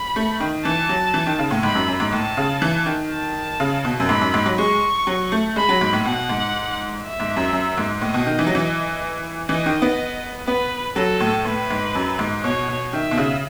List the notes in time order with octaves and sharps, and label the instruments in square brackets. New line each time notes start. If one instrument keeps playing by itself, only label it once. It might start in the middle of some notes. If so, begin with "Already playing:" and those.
Already playing: [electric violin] B5
[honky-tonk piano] A3
D#3
[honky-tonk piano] E3 [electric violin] A5
[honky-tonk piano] F#3
E3
D#3
C#3
A2
[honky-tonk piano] G#2 [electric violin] B5
[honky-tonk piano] F#2
F#2
G#2
[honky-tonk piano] A2 [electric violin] A5
[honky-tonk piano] C#3
E3
D#3
[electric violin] A5
[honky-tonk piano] C#3
B2
F#2
[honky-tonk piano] G#2 [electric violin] B5
[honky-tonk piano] F#2
G#2
F#3
[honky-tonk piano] G#3 [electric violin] C#6
[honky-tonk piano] F#3
A3
[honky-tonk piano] G#3 [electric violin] B5
[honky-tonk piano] F#3
G#2
A2
[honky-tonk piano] B2 [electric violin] F#5
[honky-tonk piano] G#2
[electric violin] E5
[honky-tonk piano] G#2
F#2
F#2
G#2
[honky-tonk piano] A2 [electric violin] D#5
[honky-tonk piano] B2
D#3
E3
F#3
E3
[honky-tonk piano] E3 [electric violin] D#5
[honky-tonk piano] D#3
B3
[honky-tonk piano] B3 [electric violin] B4
[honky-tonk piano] F#3 [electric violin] A4
[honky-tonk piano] A2
[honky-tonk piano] A2 [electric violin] B4
[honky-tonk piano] G#2
F#2
G#2
[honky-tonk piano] B2 [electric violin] C#5
[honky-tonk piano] B2
[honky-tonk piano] D#3 [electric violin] E5
[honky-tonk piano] B2
C#3